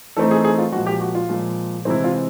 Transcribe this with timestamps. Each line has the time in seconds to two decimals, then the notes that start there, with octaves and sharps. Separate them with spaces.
0.17 E3 A3 C4 D#4 A4
0.31 G#4
0.44 G#4
0.58 F4
0.72 A#2 F3 G#3 F#4
0.86 G4
1.01 F#4
1.15 F4
1.29 A#2 F3 G#3
1.85 C3 E3 G#3 C4 E4
2.04 F4